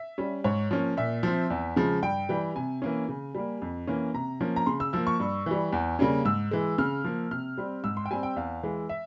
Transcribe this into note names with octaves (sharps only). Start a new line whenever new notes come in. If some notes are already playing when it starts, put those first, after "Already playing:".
Already playing: E5
G3 C#4
G#2 C#5
F3 A#3 C#4
A#2 E5
F3 C4
E2
C#3 F3 G#3
G2 G5
E3 G3
C3 G#5
E3 A#3 C#4
C#3
G3 A#3
F2
E3 A#3 C#4
C3 A#5
F3 A#3 C#4
A#5
C#3 C6
E6
F3 A#3 E6
C#6
G2
E3 G3
E2
C#3 G3 A#3 C#4
G#2 E6
E3 G#3
C#3 F6
F3 A#3
C3 F6
G3 C4
G#2 E6
C6
G5
G3 C4 G#5
G5
E2 F5
E3 G#3
E5